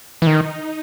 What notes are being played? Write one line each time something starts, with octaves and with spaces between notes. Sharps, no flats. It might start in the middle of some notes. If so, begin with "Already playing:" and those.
E3
D#3 D#4